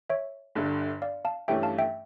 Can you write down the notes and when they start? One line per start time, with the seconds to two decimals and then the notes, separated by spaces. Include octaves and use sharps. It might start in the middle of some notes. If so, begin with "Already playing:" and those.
0.10 C#5 E5
0.55 G1 G2 D3
1.02 D5 F5
1.25 F5 A5
1.48 G2 E3 A3 C#4 G4 E5 G5
1.63 F5 A5
1.78 E5 G5